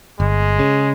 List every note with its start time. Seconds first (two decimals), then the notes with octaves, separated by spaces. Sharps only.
0.20 G1 G#3
0.59 C#3